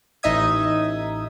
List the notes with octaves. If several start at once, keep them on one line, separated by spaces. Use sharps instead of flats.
A1 D#4 D#5 E5 D#6 G#6